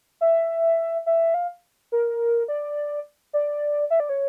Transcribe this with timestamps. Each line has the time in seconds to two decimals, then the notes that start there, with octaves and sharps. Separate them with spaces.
0.21 E5
1.06 E5
1.34 F5
1.92 A#4
2.48 D5
3.33 D5
3.90 E5
4.00 D5
4.09 C#5